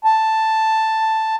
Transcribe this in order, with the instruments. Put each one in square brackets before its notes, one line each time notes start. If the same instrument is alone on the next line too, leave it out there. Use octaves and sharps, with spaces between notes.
[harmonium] A5